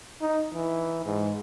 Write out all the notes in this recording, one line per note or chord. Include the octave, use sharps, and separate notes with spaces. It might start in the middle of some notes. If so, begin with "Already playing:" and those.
D#4
E3
G#2